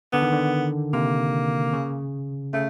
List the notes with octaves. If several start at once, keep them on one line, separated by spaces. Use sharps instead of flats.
D3 B3
D#3
D3
C3 A#3
C#3
C#3 A3